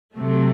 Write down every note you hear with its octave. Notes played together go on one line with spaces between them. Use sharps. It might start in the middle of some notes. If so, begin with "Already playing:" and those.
C3 F#3 A3